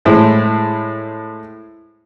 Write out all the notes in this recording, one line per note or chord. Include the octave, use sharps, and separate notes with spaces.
A2 G#3 E4 C5